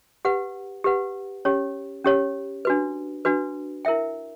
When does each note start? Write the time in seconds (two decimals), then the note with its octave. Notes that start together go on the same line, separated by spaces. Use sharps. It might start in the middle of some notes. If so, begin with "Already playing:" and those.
0.25 G4 B4 F#5
0.84 G4 B4 F#5
1.45 C#4 G4 C#5
2.04 C#4 G4 C#5
2.65 D4 F#4 B4
3.25 D4 F#4 B4
3.85 E4 A#4 E5 G5